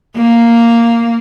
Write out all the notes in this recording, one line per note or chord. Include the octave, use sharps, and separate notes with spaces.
A#3